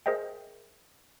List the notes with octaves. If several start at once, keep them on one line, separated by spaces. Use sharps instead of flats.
G#4 A#4 C5 D#5 E5 G5